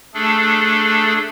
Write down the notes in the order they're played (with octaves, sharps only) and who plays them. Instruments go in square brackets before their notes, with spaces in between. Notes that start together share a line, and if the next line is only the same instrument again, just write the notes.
[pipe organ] A3 D4 G#4 A4